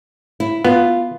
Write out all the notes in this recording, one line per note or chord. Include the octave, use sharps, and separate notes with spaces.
E4
B3 F4